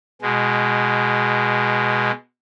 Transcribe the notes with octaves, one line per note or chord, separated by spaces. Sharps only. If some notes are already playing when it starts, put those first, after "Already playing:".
B2 G#3